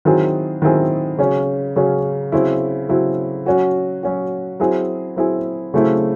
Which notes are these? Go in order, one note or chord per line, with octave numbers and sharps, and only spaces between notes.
D#3 F#3 C4 E4 G#4
D#3 F#3 C4 E4 G#4
C#3 F#3 C#4
C#3 F#3 C#4
C#3 F#3 C4 E4
C#3 F#3 C4 E4
F#3 C#4 F#4
F#3 C#4 F#4
F#3 C4 E4 G#4
F#3 C4 E4 G#4
C#3 F#3 A3 C4 E4